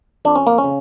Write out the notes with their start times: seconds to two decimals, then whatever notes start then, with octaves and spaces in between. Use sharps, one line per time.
0.25 F2 D4
0.36 C#4
0.47 A#3
0.58 C#4
0.64 C#3